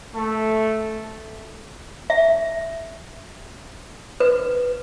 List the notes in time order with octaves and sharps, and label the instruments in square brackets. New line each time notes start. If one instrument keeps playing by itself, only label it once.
[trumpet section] A3
[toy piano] E5
B4